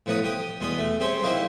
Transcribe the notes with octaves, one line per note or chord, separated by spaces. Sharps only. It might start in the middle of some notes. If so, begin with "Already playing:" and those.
A2 F3 B3 F#5 A#5 D#6
G4 G5 D#6
E2 B2 B3 C6 D#6
A3
C4 G4 G#4 C5 C#5
F#3 A#3 D#4 E4 G4 C5